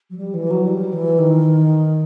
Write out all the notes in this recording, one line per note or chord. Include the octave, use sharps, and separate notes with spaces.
F#3
G3
E3
F#3
G3
E3
D#3